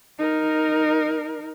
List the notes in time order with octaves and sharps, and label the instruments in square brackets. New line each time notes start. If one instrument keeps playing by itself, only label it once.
[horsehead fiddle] D#4 A#4